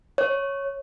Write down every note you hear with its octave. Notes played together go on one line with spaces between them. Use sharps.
C#5